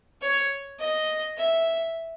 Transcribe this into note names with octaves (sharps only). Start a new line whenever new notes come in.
C#5
D#5
E5